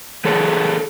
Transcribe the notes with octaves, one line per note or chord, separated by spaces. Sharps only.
E3 G#4 A4 C#5